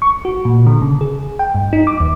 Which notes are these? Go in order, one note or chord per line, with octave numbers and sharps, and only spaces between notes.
C#6
F#4
A#2
D3
C#3
G#4
G5
G2
D#4
D6
D#2